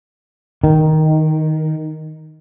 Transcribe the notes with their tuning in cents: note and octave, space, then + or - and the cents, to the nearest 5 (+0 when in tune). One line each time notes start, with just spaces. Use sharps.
D#3 +5